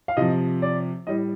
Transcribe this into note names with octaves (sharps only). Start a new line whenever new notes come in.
F5
C3 F3 D#5
D5
A2 G3 D#5